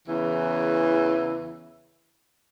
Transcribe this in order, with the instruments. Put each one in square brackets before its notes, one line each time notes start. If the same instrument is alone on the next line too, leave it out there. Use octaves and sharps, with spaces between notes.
[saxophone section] E2 C#3 E3